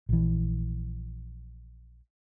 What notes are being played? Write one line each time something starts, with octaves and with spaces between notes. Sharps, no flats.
A#1 E3